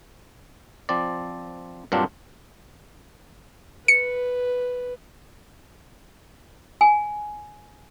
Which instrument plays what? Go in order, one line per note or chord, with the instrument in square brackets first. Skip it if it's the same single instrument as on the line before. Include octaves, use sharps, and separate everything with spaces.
[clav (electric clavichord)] F3 C4 D5
G2 A#2 F#3 C4 D4 F4
[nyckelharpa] B4 [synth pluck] C#7
[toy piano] G#5